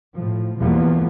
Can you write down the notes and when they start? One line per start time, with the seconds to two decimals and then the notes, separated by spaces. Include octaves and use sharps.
0.15 A2 F3
0.58 E2 B2 F3 G3 A#3 B3